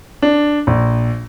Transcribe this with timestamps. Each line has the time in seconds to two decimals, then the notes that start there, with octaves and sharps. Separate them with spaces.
0.22 D4
0.67 A#1